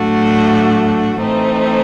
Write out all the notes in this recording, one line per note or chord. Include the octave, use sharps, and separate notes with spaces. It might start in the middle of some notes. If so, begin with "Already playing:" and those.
Already playing: A2 F#3 A3 D4 F#4
E3 A3 C4 D#4